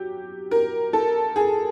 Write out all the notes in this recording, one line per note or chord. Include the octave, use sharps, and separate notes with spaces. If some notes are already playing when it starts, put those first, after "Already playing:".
Already playing: F#3 G4
A#4
A4
G#4